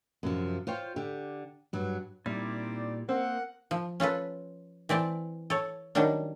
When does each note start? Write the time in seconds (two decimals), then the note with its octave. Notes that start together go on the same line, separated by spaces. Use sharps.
0.23 F#2 C3 F3
0.67 F4 C5 C#5 G5
0.96 D3 G4
1.73 G2 F#3
2.26 A#2 G3 C4 D#4 E4 D5
3.09 A#3 C4 A#4 F#5
3.71 F3
4.00 C#4 F4 A4 B4
4.89 E3 C4 D5 A5
5.50 A4 C#5
5.95 D#3 F#3 G3 C#4 D4